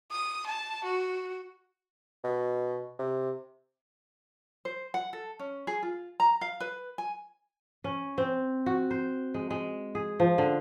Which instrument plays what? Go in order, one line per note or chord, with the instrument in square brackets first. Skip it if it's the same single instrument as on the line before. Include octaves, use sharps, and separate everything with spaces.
[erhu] D#6
A5
F#4
[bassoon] B2
C3
[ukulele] C5
F#5
A4
C#4
G#4
F4
A#5
F5
B4
G#5
[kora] C#4
C4
F#4
C5
G#3
G#3
G#4
F3
D3